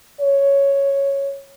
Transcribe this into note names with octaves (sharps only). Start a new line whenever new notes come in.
C#5